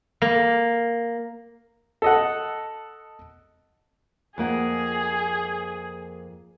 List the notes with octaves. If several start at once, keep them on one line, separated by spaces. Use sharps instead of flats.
A#3
A4 D#5 F#5
F2 A#3 G#4 F#5